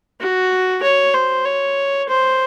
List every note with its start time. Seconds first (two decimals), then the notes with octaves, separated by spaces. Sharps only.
0.21 F#4
0.82 C#5
1.14 C5
1.45 C#5
2.09 C5